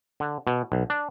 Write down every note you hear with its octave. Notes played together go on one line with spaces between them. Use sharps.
D3
B2
B1
D4